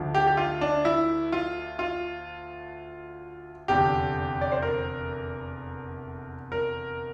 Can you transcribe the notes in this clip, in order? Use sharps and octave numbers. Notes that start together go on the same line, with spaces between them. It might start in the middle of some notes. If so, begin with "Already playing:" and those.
Already playing: D2 D3 F3
G4
G4
F4
D4
E4
F4
F4
F1 E2 D3 G4
D5
C5
A#4
A#4